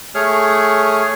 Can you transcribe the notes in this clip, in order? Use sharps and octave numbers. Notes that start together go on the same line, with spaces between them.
A3 G#4 C#5 F6